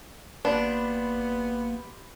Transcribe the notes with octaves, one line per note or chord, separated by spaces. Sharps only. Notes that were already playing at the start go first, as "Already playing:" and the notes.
G#1 A#3 B3 D4 G4 B5 C6